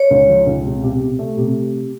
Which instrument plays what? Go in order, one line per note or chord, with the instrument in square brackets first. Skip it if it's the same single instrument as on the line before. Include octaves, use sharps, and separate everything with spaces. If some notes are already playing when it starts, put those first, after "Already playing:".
Already playing: [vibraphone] C#5
[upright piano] C#2
F3
C#2
C3
C3
C3
A3
C3